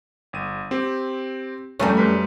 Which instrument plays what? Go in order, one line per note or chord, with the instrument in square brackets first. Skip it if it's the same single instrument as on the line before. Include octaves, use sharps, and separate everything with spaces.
[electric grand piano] G1 D#7
C4 G4
[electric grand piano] F2 A#5 [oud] G3 A3 C#4
[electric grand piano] F#2 B4 B5